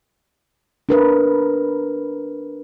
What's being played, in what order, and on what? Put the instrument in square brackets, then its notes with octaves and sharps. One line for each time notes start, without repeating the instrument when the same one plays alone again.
[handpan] D4 A#4 B4